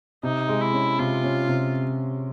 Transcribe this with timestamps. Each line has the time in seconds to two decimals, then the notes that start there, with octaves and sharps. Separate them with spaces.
0.23 C3 D#4
0.49 G#3
0.61 E4
0.74 C#4
0.99 C3 F4
1.24 C#4
1.48 C3